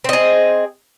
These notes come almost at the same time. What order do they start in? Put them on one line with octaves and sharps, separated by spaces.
C4 D#5 G#4